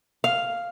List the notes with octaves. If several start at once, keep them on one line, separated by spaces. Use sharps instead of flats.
F5